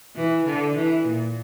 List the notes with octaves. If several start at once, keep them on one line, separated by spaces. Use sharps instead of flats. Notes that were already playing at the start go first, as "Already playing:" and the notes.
E3
D3
E3
A#2